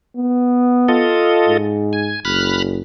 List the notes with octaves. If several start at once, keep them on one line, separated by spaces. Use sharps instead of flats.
B3
F4 A4 D#5
G#2
G#5
F#1 B5 F6 F#6